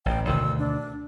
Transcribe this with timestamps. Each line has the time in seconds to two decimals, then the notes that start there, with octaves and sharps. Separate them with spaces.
0.06 A1 G5
0.27 D2 B2 D#3 E6
0.59 D4